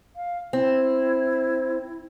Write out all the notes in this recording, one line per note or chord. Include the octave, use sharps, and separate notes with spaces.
F5
C4 E4